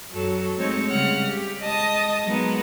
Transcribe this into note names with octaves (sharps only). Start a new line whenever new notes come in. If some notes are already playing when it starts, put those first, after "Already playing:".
F#2 F#3 A4
G#3 A3 C4 D#4 C#5
C#3 G3 G#3 F#5 F6
G4
G#3 D#5 A5 D#6
F#3 G#3 A#3 B3 D#4